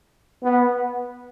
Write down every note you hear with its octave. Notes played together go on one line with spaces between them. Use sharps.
B3